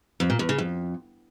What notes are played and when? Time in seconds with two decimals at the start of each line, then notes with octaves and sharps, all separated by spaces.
0.20 F2
0.30 A#2
0.39 E2
0.49 C#3
0.58 F2